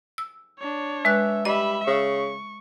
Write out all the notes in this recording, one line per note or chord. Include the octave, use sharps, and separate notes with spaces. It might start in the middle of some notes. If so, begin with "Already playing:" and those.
E6
D4 C#5
G#3 B4 E5 F#6
G3 D#5 E5 B5
C#3 C#6